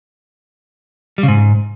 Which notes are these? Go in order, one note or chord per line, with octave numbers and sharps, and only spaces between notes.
G3
C#3
G#2